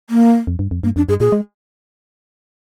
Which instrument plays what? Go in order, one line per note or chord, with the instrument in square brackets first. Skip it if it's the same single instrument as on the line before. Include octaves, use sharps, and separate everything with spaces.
[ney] A#3
[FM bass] F2
G2
F2
[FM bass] G2 [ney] A#3
[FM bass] F2 [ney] D4
[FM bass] G2 [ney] G#4
[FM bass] A#2 [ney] G#4
[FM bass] G#3